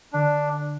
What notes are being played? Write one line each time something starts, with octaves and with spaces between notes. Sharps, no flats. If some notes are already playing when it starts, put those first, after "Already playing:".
D3 D4